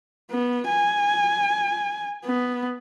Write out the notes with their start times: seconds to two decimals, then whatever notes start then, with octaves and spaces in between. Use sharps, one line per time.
0.31 B3
0.69 G#5
2.25 B3